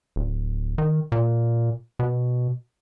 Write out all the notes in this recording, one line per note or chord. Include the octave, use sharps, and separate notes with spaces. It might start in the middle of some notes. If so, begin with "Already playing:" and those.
D1
D#3
A#2
B2